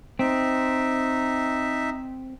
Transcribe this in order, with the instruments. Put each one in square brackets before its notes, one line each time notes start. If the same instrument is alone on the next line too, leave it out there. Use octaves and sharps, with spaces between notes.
[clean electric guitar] C4 [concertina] D#4 E5